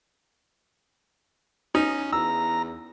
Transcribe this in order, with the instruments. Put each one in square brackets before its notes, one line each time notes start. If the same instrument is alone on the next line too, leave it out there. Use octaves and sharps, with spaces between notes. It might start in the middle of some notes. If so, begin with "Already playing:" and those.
[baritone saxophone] C#4 [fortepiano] D#4
[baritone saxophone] E2 [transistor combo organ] A#5 [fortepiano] E6